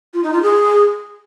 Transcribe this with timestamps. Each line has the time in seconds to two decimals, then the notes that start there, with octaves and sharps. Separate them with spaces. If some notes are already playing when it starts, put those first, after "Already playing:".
0.14 F4
0.23 D#4
0.33 F4
0.42 G#4